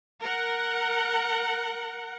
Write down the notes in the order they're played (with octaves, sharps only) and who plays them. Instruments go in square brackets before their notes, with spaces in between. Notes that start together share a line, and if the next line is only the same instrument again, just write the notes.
[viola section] A#4 F#5